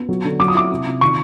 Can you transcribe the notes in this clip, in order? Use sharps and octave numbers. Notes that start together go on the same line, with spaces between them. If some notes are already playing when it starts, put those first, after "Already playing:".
Already playing: B3
F#3
D3
F#3 D6
D#6
E4 D6
C3
C3
D#3 C#6